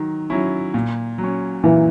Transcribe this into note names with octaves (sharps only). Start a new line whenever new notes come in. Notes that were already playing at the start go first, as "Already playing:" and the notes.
Already playing: D#3 F#3
F#3 C#4 E4
A#2
F#3
C#4
A#2 E3